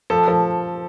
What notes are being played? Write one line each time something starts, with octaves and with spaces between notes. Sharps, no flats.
F3 A4
F3